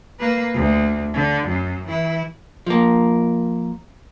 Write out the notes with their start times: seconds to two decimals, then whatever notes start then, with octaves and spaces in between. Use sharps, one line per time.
0.20 A#3 B4
0.54 D2
1.14 D3
1.48 F#2
1.87 E3 E4
2.66 F3 A#3